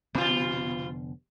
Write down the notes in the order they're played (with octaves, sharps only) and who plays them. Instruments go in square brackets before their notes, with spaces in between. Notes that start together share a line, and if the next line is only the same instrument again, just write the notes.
[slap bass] F1 D3 B3 [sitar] B2 F4